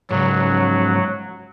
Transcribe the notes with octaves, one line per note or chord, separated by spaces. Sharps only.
G#2 C#3 F#3